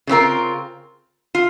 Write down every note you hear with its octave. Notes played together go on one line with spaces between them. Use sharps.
C#3 F3 C4 F4 A#4
F4